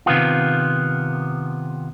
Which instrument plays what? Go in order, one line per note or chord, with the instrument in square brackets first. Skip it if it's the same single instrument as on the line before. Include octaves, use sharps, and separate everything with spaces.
[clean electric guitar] C3 D#3 B3 F4